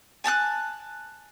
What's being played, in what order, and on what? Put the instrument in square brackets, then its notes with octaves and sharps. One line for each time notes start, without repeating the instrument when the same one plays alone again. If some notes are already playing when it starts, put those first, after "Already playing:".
[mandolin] G#5 A5 E6 F#6